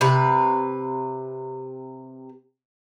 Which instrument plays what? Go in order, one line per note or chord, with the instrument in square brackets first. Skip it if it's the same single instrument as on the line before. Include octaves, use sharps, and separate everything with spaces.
[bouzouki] C3 B4